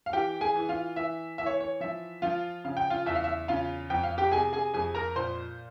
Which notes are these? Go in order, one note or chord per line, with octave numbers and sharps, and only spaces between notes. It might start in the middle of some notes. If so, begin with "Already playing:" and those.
F5
E3 G4 G5
G#4 G#5
E3
F4 F5
E3 E5
E3 E5
C#5
C#5
F3 E5
F3 F4 F5
C#3 F5
G5
F4 F5
E2 E5
F5
E5
C#3 F4 F5
F2 G5
F5
G4 G5
C3 G#4 G#5
G#4 G#5
F2 G#4 G#5
A#4 A#5
A#2 C5 C6